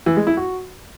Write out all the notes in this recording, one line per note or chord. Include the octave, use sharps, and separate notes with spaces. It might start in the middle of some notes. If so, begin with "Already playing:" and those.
E3
G#3
E4
F#4